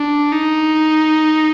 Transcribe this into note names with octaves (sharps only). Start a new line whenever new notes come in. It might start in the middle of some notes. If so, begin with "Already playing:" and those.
Already playing: D4
D#4